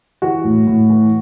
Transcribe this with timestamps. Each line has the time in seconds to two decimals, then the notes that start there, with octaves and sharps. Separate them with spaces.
0.22 E3 F#4
0.44 A2
0.67 A2
0.90 E3